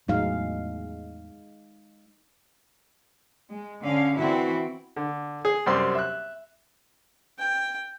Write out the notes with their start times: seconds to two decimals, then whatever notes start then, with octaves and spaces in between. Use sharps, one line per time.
0.08 E2 A2 F#3 G#3 D#4 F5
3.50 G#3
3.82 D3 C#4 F5
4.17 E3 C4 E4 F#4
4.96 D3
5.45 G#4
5.66 F#2 C3 G3 C4 C6
5.95 E5 F#6
7.39 G5